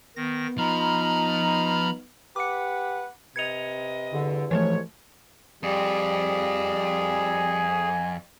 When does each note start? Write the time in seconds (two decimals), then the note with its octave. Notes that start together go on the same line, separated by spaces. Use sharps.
0.16 D#3 B3 A#6
0.58 F3 D#4 A#5 B5 F6
2.36 G4 B4 F#5 D6 C#7
3.36 C3 B4 D#5 G#6 C#7 F7
4.12 E2 G2 D3
4.51 C2 G#2 E3 F3 A3 C#5
5.63 F2 G3 G#4
7.01 G#5